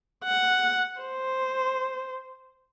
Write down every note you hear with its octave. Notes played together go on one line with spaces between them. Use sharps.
F#5
C5